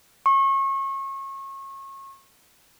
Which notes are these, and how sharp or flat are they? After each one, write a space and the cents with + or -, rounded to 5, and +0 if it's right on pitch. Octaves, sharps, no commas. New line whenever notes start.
C#6 -30